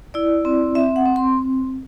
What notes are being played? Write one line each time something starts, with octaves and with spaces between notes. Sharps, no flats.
E4 D5
C4
C4 E5
F#5
C4
C6